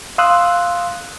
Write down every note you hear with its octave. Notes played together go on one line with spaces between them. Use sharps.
F5 C6 D#6 E6 F#6